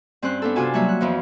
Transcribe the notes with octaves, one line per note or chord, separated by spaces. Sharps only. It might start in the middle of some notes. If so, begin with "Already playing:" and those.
G2 C4 C#4 C5 F#6
B3 D4 A4
C3 D4 F4 F#4 G#5 A5
F#3 G3 A#3 C#5 E5
F#6
F2 E3 F3 B3